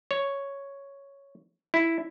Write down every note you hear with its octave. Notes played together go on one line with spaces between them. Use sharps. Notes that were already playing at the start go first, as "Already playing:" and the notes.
C#5
E4